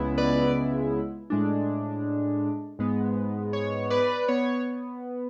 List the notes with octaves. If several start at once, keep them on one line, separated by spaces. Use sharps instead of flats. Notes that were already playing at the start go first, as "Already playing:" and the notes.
Already playing: C#2 C#3 G#3 B3 E4
B4 D5
A2 G#3 D4
G#2 G#3 B3
C#5
B4 D5
B3 C#5